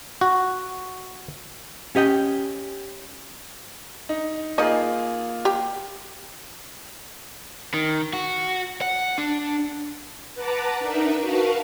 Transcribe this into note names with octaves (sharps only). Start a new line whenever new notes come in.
F#4
C#4 G4 D#5 G5
D#4
A#3 D#4 F4 G#4 D#5
G4
D#3
F#4
F#5
D4
B4 F#5 A5 A#5 D6
D4 D#4 A#4 B4 E5
F#4 A#4 B4 F5 A5 C#6